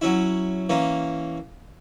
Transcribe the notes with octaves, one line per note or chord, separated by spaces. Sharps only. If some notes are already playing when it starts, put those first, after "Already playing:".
F#3 C#4 E4
E3 A#3 C#4